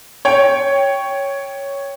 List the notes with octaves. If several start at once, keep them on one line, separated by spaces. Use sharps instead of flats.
C#5 G5